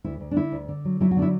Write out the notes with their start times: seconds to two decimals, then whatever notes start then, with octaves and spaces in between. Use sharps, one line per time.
0.04 D2 E4
0.20 D2
0.31 D4
0.36 D3 E4
0.52 D2
0.68 D3
0.85 F#3
1.00 F#3 E4
1.11 F#4
1.16 D3 D4
1.22 E4